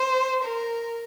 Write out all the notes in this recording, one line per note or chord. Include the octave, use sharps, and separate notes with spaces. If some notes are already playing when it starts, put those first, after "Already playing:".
Already playing: C5
A#4